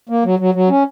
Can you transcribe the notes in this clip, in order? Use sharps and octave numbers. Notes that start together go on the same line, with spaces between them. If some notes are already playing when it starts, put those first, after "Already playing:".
A#3
F#3
F#3
F#3
C#4